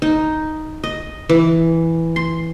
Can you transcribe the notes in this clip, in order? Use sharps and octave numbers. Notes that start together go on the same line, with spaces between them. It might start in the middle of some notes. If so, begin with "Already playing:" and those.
D#4
D#5
E3
C6